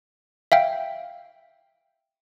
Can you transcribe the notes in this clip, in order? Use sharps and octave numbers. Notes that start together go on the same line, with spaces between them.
E5 F5 G5